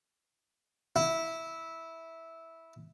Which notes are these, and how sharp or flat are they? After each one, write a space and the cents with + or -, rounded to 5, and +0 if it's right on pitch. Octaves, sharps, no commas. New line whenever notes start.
E4 -10